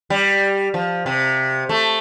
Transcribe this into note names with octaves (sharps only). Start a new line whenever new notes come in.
G3
F3
C3
A3